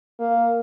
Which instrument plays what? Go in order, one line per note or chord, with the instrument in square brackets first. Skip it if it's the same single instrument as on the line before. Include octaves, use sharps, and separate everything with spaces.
[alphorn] A#3